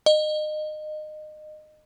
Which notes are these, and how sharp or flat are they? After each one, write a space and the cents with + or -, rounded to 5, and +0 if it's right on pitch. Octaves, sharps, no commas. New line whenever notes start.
D#5 -25